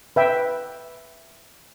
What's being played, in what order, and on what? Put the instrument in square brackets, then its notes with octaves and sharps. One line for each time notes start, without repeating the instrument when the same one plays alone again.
[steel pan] B4 E5 G5